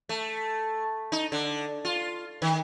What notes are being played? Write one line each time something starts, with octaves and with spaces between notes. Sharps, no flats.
A3
D#4
D3
F4
D#3